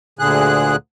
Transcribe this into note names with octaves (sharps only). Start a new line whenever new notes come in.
D2 A#2 D3 G#4 F#6